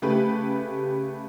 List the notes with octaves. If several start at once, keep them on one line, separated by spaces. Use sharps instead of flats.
C#3 A3 G4 B4